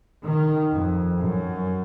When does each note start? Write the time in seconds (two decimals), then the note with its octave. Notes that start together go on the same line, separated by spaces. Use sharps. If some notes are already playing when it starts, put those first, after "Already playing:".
0.24 D#3
0.71 F2
1.18 F#2